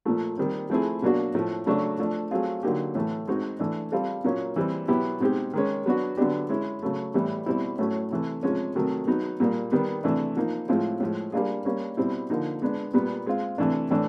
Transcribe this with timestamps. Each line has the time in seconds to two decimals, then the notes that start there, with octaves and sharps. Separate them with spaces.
0.05 A#2 F3 A3
0.38 D#3 G3 C4
0.70 F3 A3 C4 E4 G#4
1.02 B2 F#3 A#3 D4 F#4
1.35 A2 F3 A3
1.66 C#3 F#3 A3 D4 F#4
1.99 F3 A3 D4
2.31 F#3 A3 C4 F4 G#4
2.63 D3 F#3 A#3 D#4 G4
2.95 A2 E3 A3
3.28 G#3 C4 D#4 F#4
3.59 E3 A3 D4
3.92 G3 C4 F4 A4
4.24 A#2 F#3 A#3 C#4
4.56 E3 G3 C4
4.88 B2 F#3 B3 E4 G4
5.20 B2 G#3 C4 D#4 G4
5.54 D#3 G#3 C#4
5.86 F#3 B3 D4 F#4
6.17 D3 F#3 B3 D4 G4
6.49 G#3 C#4 E4
6.82 C#3 F#3 A3
7.14 A2 E3 G3 B3 E4
7.46 B2 G3 C4 E4
7.79 A2 F#3 A3 C#4
8.11 C3 E3 A3
8.43 C3 F3 G#3 C#4
8.75 C3 D#3 F#3 A3
9.07 F#3 B3 D#4
9.40 A#2 G3 A#3
9.72 D#3 G3 B3
10.04 C3 E3 A3 D4
10.37 F3 A#3 D#4
10.69 A2 F3 G#3 C4 F4
11.00 A2 F3 G#3
11.32 G3 A#3 D4 F4 G#4
11.65 G3 A#3 C#4
11.97 B2 G3 C4 E4
12.30 D3 F3 A#3 D#4
12.62 G#3 B3 D4
12.94 A#2 G3 B3
13.27 G#3 C4 F4
13.58 C3 E3 A3 D4
13.91 A2 E3 A3 D4